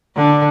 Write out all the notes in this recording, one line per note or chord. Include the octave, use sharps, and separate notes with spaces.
D3